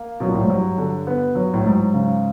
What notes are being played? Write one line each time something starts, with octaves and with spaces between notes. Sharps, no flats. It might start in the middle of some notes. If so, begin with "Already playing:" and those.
Already playing: A#3
B2 F#3
A#2
A2
G#2
G2 F#3
D3
B3
F#3
A2
G#2 F#3
C#3